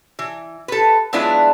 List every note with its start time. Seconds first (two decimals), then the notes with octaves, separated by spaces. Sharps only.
0.19 E3
0.68 A4 B4
1.13 F#3 G#3 B3 D4 E4 F4